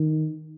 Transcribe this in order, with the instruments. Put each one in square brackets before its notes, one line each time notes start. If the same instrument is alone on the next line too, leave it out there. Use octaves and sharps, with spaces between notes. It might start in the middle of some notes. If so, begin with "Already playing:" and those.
Already playing: [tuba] D#3